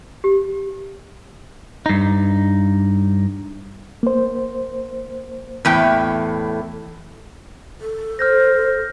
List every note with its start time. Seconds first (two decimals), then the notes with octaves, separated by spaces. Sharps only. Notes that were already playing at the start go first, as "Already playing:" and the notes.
0.24 G4
1.86 G2 D#4
4.03 A#3 C5
5.65 E2 A2 G5
7.81 A4
8.19 C5 F6 G6 A#6